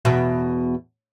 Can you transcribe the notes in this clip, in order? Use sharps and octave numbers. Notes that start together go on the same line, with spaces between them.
E2 B2 E5